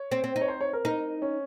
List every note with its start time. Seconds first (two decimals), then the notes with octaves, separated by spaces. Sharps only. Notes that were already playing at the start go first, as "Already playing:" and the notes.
Already playing: C#5
0.11 C4
0.24 C4
0.36 D#4
0.41 C#5
0.48 C5
0.61 C#5
0.73 A#4
0.85 D#4 A#4
1.22 C#4